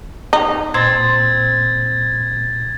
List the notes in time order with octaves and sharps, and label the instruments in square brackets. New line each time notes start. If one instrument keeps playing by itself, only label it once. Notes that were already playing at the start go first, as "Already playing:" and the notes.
[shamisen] D#4
[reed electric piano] A#2 [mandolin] C4 [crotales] G#6 A6